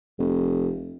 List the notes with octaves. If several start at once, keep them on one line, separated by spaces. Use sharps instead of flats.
F1